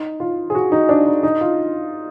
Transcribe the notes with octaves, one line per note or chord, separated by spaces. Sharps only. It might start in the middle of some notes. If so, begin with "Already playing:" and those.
Already playing: D#4
F4
G#4
F#4
D#4
D4
D#4
D#4
F4